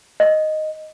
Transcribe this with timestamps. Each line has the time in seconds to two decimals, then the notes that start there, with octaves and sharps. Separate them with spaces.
0.20 D#5